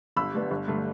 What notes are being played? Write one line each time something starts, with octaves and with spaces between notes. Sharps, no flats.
G1 B5 E6
G2 D3 G3 B3
G1
G2 D3 A3